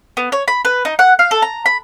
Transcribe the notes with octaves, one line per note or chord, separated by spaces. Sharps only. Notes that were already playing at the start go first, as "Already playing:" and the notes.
B3
C#5
B5
B4
D#4
F#5
F5
A4
A#5
B5